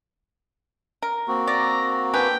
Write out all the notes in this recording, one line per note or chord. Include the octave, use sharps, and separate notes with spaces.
A#4
A#3 C4 F#4
D5 A#5
D3 G#4 B4 G5